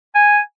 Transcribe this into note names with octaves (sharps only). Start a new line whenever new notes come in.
G#5